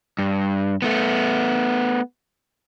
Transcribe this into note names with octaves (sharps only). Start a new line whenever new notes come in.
G2
A3 B3